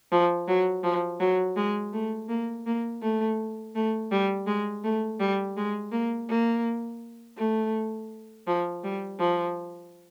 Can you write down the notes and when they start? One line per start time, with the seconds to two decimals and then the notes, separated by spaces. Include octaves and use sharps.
0.12 F3
0.48 F#3
0.84 F3
1.20 F#3
1.56 G#3
1.93 A3
2.29 A#3
2.66 A#3
3.02 A3
3.75 A3
4.12 G3
4.47 G#3
4.84 A3
5.20 G3
5.57 G#3
5.92 A#3
6.29 A#3
7.37 A3
8.47 F3
8.84 G3
9.19 F3